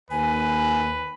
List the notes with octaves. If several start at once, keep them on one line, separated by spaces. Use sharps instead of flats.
D#2 B4 G#5